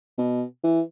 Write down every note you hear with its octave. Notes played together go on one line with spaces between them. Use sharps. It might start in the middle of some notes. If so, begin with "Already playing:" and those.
B2
E3